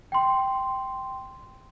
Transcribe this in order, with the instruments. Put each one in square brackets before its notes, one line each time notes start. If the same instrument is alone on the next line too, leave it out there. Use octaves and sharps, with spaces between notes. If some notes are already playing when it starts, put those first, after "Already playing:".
[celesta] G5 C6